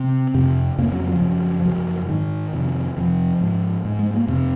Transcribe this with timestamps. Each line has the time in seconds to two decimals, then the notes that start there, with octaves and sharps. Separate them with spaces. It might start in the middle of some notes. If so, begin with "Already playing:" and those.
Already playing: C3 C4
0.34 F2 C3
0.78 F2 C#3 A#3
0.92 F#3
1.08 F3
1.21 F#2 C#3
1.65 F#2 C#3
2.09 G#2 D#3
2.53 F2 C3
2.97 F2 C3 F3
3.41 G#2
3.85 G#2
3.99 G#3
4.14 A#3
4.27 F2 C3 C4